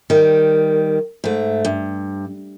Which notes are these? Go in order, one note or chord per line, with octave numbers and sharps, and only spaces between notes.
D#3 G3
G#2 A3
G2